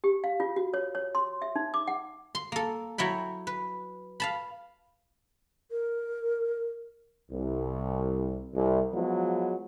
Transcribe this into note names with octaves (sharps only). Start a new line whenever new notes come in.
G4
F5
F4
F#4
C#5
C#5
C6
E5
D#4
D6
F#5
C6
A#3 A4
F#3 E4 G5 B5
B4
F5 A5 B5
A#4
C2
C2
F3 F#3 G#3 B3